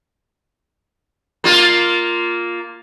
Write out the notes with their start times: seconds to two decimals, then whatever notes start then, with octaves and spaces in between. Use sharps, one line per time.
1.44 A#3 F4